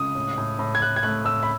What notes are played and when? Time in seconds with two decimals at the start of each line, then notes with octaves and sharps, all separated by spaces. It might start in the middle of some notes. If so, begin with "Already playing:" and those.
Already playing: C#2 D#6
0.15 A2
0.38 A2
0.59 A2
0.75 G#6
0.81 A2 F#6
0.96 G#6
1.03 A3 F#6
1.25 A2 E6
1.43 B5